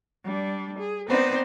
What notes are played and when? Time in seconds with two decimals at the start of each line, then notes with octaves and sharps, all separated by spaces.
0.23 G3 D4
0.78 G#4
1.08 B3 C4 D#4 B4 C5 D5